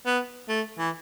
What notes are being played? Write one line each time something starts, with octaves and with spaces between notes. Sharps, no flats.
B3
A3
E3